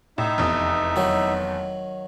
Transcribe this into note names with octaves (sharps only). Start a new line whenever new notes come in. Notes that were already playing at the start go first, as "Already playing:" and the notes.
A2 D#4 E5
F1 E2 D#6
D#3 F#3